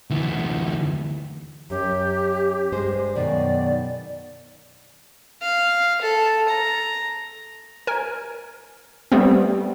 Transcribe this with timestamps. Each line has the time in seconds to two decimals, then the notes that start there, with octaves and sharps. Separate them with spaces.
0.10 D2 E3
1.70 F#2 C#4 G4
2.72 G2 G#3 C5
3.15 F#2 B2 D#3 D5
5.42 F5
6.01 A4
6.48 A#5
7.87 A#4 G#5
9.12 G3 A3 B3 C4